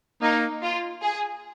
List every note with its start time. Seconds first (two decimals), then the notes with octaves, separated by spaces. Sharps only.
0.21 A#3 D#4
0.62 F4
1.02 G#4